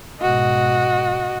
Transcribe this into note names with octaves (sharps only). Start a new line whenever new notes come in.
G#2 B2 F#4 D#5